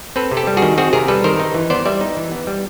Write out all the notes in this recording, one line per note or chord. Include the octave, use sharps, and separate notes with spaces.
C4 A4 B4
C3
G4 A4
G3
F#4 G#4
D#3
C4 F#4 G#4
C3 G#4 A#4
G3 A4 B4
D#3 A#4 C5
D#4
E3
B3 C5 D5
G3 D5 E5
D#4
E3
B3
G3